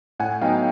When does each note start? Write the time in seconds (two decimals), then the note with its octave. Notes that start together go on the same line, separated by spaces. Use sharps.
0.19 A2 F#5 G#5
0.41 F#3 B3 D#4 F5 G5